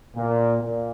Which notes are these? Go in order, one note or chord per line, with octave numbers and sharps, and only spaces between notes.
A#2
A#2